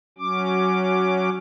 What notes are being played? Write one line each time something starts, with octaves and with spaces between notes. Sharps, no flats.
F#3 C#4 D6